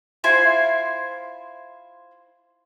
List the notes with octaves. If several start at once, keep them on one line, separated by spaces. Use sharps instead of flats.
E4 F4 C5 G#5